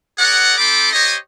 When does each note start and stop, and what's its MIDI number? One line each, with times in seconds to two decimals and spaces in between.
0.18 0.58 68
0.18 0.58 70
0.18 0.58 74
0.18 0.58 78
0.58 0.91 60
0.58 0.91 63
0.58 0.91 69
0.58 0.91 83
0.58 0.91 84
0.58 0.91 86
0.93 1.16 67
0.93 1.16 72
0.93 1.16 73
0.93 1.16 75